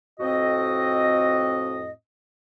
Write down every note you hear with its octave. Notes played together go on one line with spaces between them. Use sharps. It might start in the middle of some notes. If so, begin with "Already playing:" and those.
F2 A2 C4 F#4 D#5